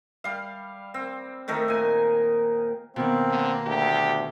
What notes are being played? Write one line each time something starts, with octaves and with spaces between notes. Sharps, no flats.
G3 F5
C4
D#3 A3 D#4 A#4
A#2 G#5
B2 D#3 A#3 C4
D3
D2 G4